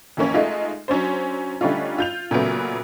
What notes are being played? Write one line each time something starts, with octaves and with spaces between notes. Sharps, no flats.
F2 E3 A#3 C#4
G#3 A3 D#4 F4
F#3 C#4 D4 C5
D3 G3 A3 C#4 D#4 F4
F4 G6 F7
A#2 C#3 F#3 A3 B3